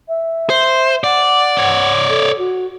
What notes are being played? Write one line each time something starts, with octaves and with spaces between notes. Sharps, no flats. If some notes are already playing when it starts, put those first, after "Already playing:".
E5
C5
D5 F#5
C#5 D5
A4
F#4